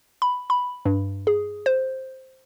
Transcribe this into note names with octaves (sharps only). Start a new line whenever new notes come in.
B5
B5
G2
G#4
C5